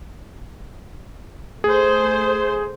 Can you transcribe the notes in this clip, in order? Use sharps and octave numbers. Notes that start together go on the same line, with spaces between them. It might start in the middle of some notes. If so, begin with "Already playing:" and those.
A3 G#4 C5